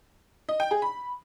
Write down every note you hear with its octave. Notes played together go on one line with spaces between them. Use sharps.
D#5
G5
G#4
B5